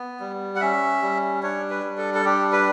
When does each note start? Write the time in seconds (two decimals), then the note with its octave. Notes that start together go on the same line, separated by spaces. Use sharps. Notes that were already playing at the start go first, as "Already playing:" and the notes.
Already playing: B3
0.20 G3
0.56 F#5
0.61 C#4 E5
1.02 G3
1.43 D4 C#5
1.70 B4
1.84 G3
1.98 A4
2.14 A4
2.25 D4 G4
2.52 B4